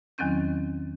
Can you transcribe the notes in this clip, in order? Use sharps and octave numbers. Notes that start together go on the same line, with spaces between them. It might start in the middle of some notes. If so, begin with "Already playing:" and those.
E2 D#3 F#3 C4 C#4 G6